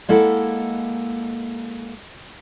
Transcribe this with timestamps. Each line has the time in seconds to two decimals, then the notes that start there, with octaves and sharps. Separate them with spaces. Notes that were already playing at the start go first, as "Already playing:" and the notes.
0.09 G#3 A#3 E4 A4 F#5